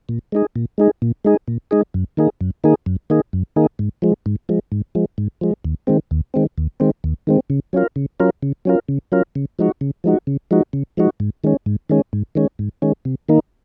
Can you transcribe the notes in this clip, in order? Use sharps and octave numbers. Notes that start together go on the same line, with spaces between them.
A#2
G#3 D#4 G#4
A#2
G#3 D#4 G#4
A#2
G#3 D#4 G#4
A#2
G#3 D#4 G#4
F#2
D#3 A#3 D#4 G#4
F#2
D#3 A#3 D#4 G#4
F#2
D#3 A#3 D#4 G#4
F#2
D#3 A#3 D#4 G#4
G#2
F3 G#3
G#2
F3 G#3
G#2
F3 G#3
G#2
F3 G#3
D#2
D#3 G#3 C4
D#2
D#3 G#3 C4
D#2
D#3 G#3 C4
D#2
D#3 G#3 C4
C#3
F#3 C#4 F4 A#4
C#3
F#3 C#4 F4 A#4
C#3
F#3 C#4 F4 A#4
C#3
F#3 C#4 F4 A#4
C#3
F3 G#3 D#4 F#4
C#3
F3 G#3 D#4 F#4
C#3
F3 G#3 D#4 F#4
C#3
F3 G#3 D#4 F#4
G#2
D#3 G#3 C#4
G#2
D#3 G#3 C#4
G#2
D#3 G#3 C#4
G#2
D#3 G#3 C#4
C3
D#3 A#3 D#4